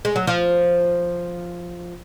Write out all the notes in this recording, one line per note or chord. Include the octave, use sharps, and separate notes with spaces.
G#3
F#3
F3